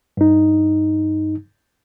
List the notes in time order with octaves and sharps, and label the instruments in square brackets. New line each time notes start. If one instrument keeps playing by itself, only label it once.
[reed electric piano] G2 D#4